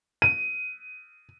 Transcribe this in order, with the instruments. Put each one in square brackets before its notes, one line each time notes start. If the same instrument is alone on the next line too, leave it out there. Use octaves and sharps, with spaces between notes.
[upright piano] D#7